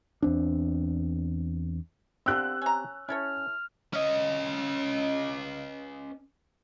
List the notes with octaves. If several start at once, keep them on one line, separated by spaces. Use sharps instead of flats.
E2 C4 D4
D3 G3 C4 F4 G4 E6 F#6
C#4 A#5
C#4 E4 A4 C#5 F6
C#4 D#5